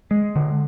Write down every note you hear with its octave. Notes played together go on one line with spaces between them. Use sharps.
G#3
D3